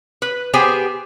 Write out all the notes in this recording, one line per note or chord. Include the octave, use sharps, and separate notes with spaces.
B4
B3 G4 G#4 C5 G5 G#5